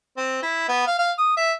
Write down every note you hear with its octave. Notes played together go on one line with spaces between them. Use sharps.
C4
E4
B3
F5
F5
D#6
E5